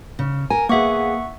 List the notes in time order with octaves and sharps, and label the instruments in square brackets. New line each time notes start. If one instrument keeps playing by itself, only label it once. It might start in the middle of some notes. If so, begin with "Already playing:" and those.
[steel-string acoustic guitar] C#3
[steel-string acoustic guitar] A#4 [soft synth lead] G#5
[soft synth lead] A#3 [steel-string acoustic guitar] B3 G#4 [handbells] E5 F#5 C#6